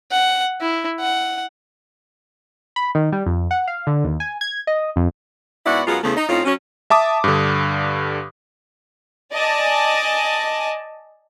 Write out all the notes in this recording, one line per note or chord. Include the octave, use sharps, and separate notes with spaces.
F#5
E4
F#5
B5
D#3
G3
F2
F#5
F5
D3
D#2
G#5
G#6
D#5
F2
G#2 B3 E4 F#4 D5 F#5
F#2 F#3 G#3 B3 F4
E2 C#3 A3
D#4
A2 C4 C#4 D#4 F4
F#3 C#4
E5 A5 D6 D#6
G2 D3
D5 D#5 G#5 A5